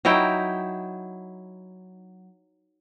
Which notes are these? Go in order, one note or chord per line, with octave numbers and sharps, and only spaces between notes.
F#3 D#4 E4 G5